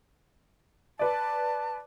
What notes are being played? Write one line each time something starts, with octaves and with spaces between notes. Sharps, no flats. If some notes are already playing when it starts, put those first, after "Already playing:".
B4 D5 A5